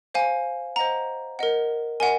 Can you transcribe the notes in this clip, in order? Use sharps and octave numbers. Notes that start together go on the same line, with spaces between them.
C5 F5 G#5
C5 D#5 F#5 A#5
A#4 D#5 F#5
A#4 D#5 F#5 G#5